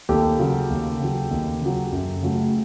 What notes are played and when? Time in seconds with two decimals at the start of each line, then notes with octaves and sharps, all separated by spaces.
0.09 D#2 G4 A4
0.39 C#3 F#3
0.70 D#2
1.00 C#3 F#3
1.31 D#2
1.61 C#3 F#3
1.92 F#2
2.23 C#3 F#3 A3